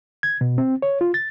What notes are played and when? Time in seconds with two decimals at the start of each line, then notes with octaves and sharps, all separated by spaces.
0.23 G#6
0.41 B2
0.58 C4
0.82 C#5
1.01 F4
1.14 A6